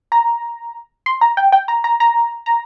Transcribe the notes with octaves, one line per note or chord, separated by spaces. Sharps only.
A#5
C6
A#5
G5
G5
A#5
A#5
A#5
A#5